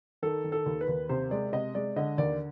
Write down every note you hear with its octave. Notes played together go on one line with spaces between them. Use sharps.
D#3 A4
D#3
A4
D#2
B4
D#2
C3 C5
G#3 D5
C3 D#5
G#3 D5
D3 D#5
D#2 D5